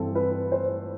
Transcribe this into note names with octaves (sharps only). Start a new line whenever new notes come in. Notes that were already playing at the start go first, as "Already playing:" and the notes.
Already playing: G2 E3 C4 A4
B4
C5